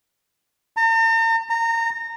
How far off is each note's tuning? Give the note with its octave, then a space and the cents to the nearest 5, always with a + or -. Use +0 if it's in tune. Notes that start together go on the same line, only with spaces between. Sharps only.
A#5 -45
A#5 -25